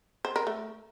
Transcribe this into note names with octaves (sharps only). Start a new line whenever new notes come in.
C5
A#4
A3